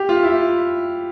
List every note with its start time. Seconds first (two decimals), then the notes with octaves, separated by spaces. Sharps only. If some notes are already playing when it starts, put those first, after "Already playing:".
Already playing: G4
0.09 F4
0.23 E4